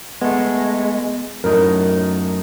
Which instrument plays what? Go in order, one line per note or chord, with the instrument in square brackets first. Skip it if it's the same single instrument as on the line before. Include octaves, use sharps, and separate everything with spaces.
[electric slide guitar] G#3 A3 [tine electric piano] B3
[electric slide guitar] F#2 A2 D#4 [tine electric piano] A#4